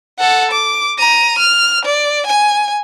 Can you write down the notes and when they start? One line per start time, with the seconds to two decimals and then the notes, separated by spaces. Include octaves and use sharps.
0.19 A4 F#5
0.51 D6
0.99 A#5 D#7
1.38 F6
1.85 D5
2.27 G#5